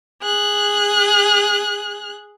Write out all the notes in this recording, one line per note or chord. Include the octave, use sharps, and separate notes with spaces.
G#4 F#6